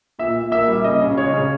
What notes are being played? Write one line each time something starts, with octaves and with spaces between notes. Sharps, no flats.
A#2 E5
A#2
A#3 E5
G3
C#3 D#5
C#3
G#3 C#5
C#3